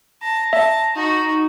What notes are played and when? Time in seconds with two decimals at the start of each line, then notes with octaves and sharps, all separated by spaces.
0.22 A5 A#5
0.53 E5 A5
0.95 D#4 F#4 A#5